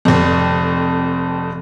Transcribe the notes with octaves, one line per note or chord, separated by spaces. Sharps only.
F1 F2